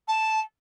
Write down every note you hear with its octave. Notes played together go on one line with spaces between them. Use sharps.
A5